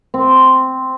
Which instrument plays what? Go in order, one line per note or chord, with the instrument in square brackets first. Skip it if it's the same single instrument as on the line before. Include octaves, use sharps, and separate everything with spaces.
[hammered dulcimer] C4